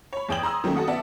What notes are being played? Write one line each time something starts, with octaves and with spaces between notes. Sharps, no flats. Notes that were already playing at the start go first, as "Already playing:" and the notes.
C#5 B5
E2 G#4 G5 D#6 G#6 F#7
A#5 C6 D#6 E6
D#3 F#3 A3 A#3 C#4
F#4 A4 F#5 D#6
B3 D5 E5 F#5 A5